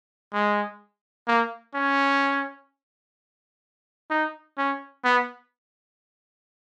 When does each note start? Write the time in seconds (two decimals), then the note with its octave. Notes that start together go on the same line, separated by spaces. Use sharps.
0.33 G#3
1.28 A#3
1.74 C#4
4.10 D#4
4.58 C#4
5.04 B3